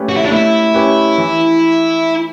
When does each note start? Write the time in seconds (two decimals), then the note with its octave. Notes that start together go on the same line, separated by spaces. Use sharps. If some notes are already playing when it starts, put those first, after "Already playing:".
Already playing: A3 C#4 G4 B4
0.09 F#4
0.17 E4
0.25 D4
0.31 A3 E4
0.74 C#4 G4 B4
1.18 E3